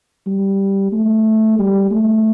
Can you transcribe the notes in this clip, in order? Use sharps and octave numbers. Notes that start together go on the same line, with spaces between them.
G3
A3
G3
A3